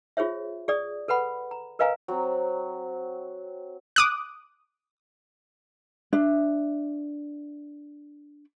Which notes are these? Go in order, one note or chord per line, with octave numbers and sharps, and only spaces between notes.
F4 G#4 C5 C#5 E5
G#4 D5 D#6
A4 B4 F#5 B5
A#5
A#4 B4 D#5 F5 G#5 A#5
F#3 C4
D6 D#6 F#6
D4 E5